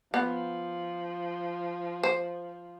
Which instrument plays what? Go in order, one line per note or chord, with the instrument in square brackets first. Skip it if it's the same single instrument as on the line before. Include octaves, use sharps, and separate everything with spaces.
[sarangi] F3 [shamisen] B3
[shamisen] C5